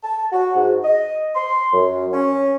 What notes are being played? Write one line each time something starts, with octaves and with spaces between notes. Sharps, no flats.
A5
F#4
G#2
D#5
C6
F#2
C#4